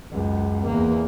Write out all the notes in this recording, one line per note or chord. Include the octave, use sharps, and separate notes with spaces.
C#2 F#2
E2 A#3